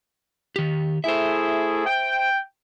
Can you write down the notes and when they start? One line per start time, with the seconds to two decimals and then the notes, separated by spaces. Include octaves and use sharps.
0.56 D#3 G4
1.04 A3 E4 G#4 C5 E5
1.86 G5